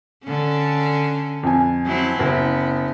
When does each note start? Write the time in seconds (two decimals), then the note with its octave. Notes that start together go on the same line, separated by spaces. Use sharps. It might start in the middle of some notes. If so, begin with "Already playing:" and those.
0.24 D3 C#4
1.43 F2 G#5
1.85 F#3 C4 E4
2.19 F#1 B3